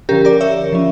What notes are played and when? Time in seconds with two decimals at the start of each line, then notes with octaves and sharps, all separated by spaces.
0.09 D3 F3 C#4 G4 A#4
0.25 A#4 D5
0.41 C#5 E5
0.73 F3 C#4